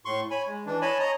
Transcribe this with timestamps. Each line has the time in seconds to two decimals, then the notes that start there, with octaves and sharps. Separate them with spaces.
0.05 A2 C6 C#6
0.31 C#5 G#5 B5
0.47 G#3
0.66 E3 D4
0.82 C#5 D#5 G#5 A5 B5
1.00 C#5 D#5 A#5